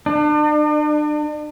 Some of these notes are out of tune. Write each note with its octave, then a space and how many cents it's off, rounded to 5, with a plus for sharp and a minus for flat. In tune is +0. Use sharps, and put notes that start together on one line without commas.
D4 +40